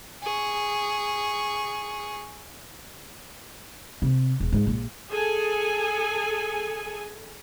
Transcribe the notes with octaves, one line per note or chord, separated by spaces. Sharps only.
G#4 C#6
C3
E1
G#2
A#1
G#4 A4 G#5